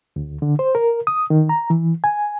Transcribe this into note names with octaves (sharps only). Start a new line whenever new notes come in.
D2
D3
C5
A#4
D#6
D#3
A#5
E3
G#5